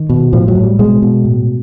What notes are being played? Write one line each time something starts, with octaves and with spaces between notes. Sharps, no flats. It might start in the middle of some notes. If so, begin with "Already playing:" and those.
Already playing: D#3
B2
A2 F3
F#3
A2
G3
B2 G#3
B2
A2